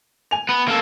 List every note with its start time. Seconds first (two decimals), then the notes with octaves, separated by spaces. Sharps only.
0.31 G#5 F7
0.49 B3
0.68 A#3 A4